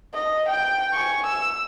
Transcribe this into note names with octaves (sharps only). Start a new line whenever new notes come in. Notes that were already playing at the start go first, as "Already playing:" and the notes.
D#5
G5
G#5 C#6
E6